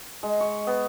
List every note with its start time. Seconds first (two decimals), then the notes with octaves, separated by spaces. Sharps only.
0.23 G#3
0.41 C#6
0.67 B3